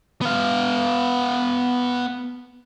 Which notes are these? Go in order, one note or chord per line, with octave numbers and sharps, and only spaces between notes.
B3 F5